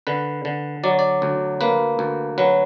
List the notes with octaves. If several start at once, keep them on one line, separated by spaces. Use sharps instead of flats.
D3 B4
D3
F#3 D5
D5
D2
A#3 B4
D2
F#3 B4